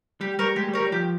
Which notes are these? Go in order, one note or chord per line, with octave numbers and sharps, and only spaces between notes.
G3 G4
G3 A#4 C#5
G#3 G4
G3
A#4 C#5
G3
F3 G4